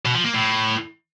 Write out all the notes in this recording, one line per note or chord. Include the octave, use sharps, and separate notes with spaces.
B2
F3
A#3
A2